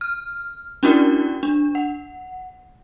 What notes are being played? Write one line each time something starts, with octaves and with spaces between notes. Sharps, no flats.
F6
C#4 D4 E4 F#4 A#4 D5
D4
F#5